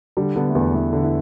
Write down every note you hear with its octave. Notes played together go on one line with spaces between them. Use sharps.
D3 G3
D3 B3
A3
E2 B3
E2 E4
D3
E4